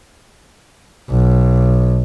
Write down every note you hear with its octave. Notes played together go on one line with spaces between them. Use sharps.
B1